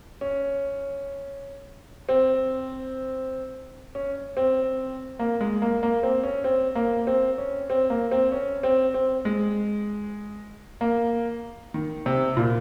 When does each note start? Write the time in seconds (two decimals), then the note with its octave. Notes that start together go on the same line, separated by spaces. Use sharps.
0.21 C#4
2.09 C4
3.95 C#4
4.37 C4
5.19 A#3
5.41 G#3
5.62 A#3
5.83 A#3
6.03 C4
6.24 C#4
6.44 C4
6.75 A#3
7.07 C4
7.38 C#4
7.70 C4
7.90 A#3
8.11 C4
8.32 C#4
8.63 C4
8.94 C4
9.25 G#3
10.81 A#3
11.74 D#3
12.06 C3
12.37 A#2